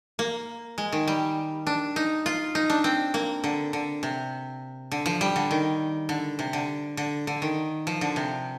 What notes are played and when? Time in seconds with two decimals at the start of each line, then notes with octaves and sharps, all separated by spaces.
0.19 A#3
0.78 G#3
0.92 D#3
1.08 G3
1.67 D4
1.96 D#4
2.26 F4
2.55 D#4
2.70 D4
2.84 C4
3.14 A#3
3.44 D3
3.73 D3
4.03 C3
4.92 D3
5.06 F3
5.21 G3
5.36 D3
5.51 D#3
6.09 D3
6.39 C3
6.53 D3
6.97 D3
7.27 D3
7.42 D#3
7.87 F3
8.01 D3
8.16 C3